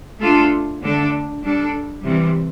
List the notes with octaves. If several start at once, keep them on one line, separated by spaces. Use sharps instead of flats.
A3 D4 F4 A4
D3 A3 D4 A4
G3 D4 A4
C3 E3 G3